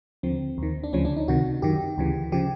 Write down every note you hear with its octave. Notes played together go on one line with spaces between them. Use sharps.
D#2 D3 F3 C4
D#2 D#3
D4
D2 C#3 F3 C#4
D4
D#4
C#2 C3 D#3 F#4
F#2 D#3 G4
D2 C#3 E3
C#3 F3 G4